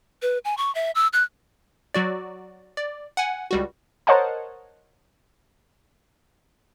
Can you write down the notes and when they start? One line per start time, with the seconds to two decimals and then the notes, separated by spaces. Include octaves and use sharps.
0.22 B4
0.45 G#5
0.57 C#6
0.75 E5
0.95 E6
1.13 F#6
1.94 F#3 F#4 D5
2.77 D5
3.17 F#5 G#5
3.51 C#2 G3 F#4
4.07 A#4 C5 C#5 D#5 F#5 A5